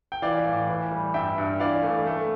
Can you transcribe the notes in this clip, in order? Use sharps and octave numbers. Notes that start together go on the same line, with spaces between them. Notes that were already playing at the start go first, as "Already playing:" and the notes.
G5
E3 D5 F5
A2
E3
G3
G2 E5 G5
G2
E3 D5 F5
A3
A3